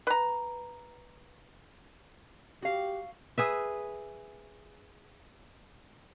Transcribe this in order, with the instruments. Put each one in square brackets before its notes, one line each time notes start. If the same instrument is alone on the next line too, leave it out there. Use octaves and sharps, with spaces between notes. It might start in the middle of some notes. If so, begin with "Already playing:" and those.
[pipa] B4 A#5
[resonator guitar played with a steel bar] F#4 F5 [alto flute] G4
[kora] G#4 B4 E5